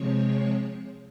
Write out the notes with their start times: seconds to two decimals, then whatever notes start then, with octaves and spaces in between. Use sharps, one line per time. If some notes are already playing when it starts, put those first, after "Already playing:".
Already playing: C3 F3 G#3 C4 C#5 C#6